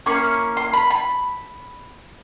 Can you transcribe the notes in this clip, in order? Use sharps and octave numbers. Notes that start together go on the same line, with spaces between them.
A#3 C#4 E4 C#6
C6
B5
B5